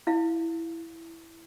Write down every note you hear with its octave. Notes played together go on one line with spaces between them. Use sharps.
E4 F5